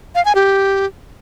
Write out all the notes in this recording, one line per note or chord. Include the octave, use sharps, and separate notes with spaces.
F5
G#5
G4